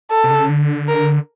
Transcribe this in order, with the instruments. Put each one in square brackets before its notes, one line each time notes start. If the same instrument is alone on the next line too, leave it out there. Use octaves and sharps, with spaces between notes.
[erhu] A4
[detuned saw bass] C3
C#3
D3
[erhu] A#4